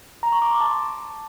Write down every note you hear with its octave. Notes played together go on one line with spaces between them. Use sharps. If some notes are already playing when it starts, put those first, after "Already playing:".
A#5
C#6
D6
C6
A5